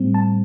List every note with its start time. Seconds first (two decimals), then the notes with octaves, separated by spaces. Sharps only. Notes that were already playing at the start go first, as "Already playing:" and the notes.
Already playing: A2 G3 C4
0.14 A5